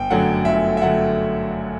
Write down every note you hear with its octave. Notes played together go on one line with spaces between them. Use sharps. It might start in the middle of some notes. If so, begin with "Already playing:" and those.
Already playing: G1 G5
F#2 D3 F#3 A3 F#5
G1 E5
E5
D3 F#3 A3 F#5